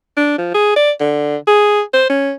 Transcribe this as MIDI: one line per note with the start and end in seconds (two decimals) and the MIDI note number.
0.17 0.38 62
0.38 0.54 53
0.54 0.73 68
0.76 0.91 74
1.00 1.36 50
1.47 1.81 68
1.93 2.05 72
2.10 2.32 61